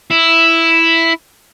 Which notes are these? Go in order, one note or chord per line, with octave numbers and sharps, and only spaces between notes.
E4